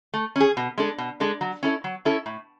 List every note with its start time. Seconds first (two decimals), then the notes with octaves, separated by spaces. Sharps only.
0.14 A3
0.36 C#4 G#4
0.57 B2
0.78 G#3 D4 A4
0.98 B2
1.20 G#3 D4 A4
1.41 F#3
1.63 C#4 E4 A4
1.84 F#3
2.05 C#4 E4 A4
2.26 A2